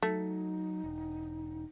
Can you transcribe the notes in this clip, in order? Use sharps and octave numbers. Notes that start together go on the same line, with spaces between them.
F#3 A3 D#4
E1